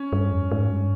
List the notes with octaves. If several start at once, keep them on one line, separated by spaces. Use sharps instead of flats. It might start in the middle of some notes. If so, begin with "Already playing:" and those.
Already playing: C#4
G2
F2
G#2
G2